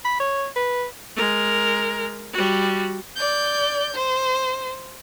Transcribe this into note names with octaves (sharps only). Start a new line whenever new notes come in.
B5
C#5
B4
G#3 A#4
G3 F#4
D5 G6
C5